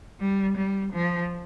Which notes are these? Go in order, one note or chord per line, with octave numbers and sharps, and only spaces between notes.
G3
G3
F3